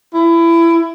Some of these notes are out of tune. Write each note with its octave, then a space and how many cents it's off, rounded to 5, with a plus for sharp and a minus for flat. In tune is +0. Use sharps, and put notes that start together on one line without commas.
E4 +20